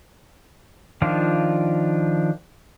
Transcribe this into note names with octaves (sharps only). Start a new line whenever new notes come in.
D#3 F3 D4 F4